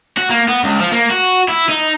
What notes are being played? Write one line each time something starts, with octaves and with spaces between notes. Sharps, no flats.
F#4
A#3
B3
C#2
F3
A#3
F#4
E4
D#4